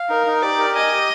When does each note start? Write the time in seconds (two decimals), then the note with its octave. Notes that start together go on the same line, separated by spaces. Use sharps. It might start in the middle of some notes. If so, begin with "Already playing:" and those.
Already playing: F5
0.09 D#4 A#4
0.27 D#4
0.42 G4 D5
0.59 A#4
0.75 D#5 G#5
0.92 G4